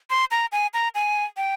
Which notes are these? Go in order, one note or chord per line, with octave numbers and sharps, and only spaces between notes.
C6
A#5
G#5
A#5
G#5
G5